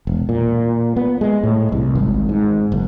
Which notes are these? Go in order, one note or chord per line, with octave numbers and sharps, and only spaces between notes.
E1
A#2
B3
G#3
A2
C2
G#1
G#2
F#1